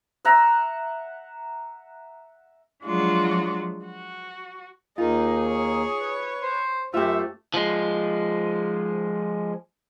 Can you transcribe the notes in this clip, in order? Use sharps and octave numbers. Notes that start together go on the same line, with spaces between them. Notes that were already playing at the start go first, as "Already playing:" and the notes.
E5 F#5 A#5
F3 F#3 G#3 D4 F4 F#4
F#4
D#2 A#3 D#4 F4 G#4
C#5
B4
C5
F#2 A3 F4 G4 C5 E5
F3 G#3